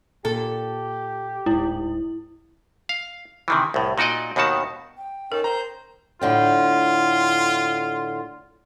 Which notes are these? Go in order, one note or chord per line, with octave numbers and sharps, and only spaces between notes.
A#2 G4 A4
D1 G#2 E4
F5
C3 D#3 E3
C2 A2
A#2 D#4 F#4 D5 D#5
D#2 B2 D#3 F#4 A5
G5
C#4 D#4 A4 A#4
C5 A#5 G6
A2 D3 F4 G5